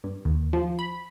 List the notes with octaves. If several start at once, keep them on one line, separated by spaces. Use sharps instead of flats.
G2
D#2
F3
B5